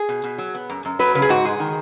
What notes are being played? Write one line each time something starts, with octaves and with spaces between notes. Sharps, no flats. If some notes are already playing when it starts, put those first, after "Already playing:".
Already playing: G#4
B2
B2
F#3
B3
F#2
F#2
F#3 B4
C#3 B4
G#4
G#2 F#4
G#3 G#4
D#3